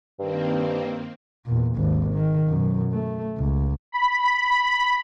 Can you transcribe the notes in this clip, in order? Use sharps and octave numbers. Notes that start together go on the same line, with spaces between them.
G2 D#3 A#3 C4
E2 A#2
G#1 D#2
D#3
F#2 B2
A3
C#2
B5